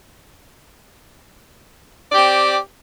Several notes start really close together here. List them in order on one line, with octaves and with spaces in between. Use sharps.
D5 G4 C4